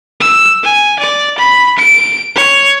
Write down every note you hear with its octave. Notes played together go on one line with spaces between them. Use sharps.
E6
G#5
D5
B5
D7
C#5